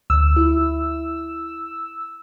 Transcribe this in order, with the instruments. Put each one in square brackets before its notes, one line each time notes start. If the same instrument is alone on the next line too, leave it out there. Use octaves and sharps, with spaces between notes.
[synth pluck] D2 [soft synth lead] E6
[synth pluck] E4